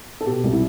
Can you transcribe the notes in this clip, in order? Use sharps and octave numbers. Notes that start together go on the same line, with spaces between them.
A4
B2 G4
C2
E4